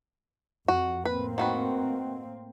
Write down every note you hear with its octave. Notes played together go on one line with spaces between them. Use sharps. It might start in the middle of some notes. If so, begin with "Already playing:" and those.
F2 F#4
A2 A#3 C4 B4
D#3 F#4 B4